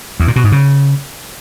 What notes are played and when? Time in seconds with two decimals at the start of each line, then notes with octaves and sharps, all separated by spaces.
0.20 E2
0.28 A#2
0.36 B2
0.44 G#2
0.52 C#3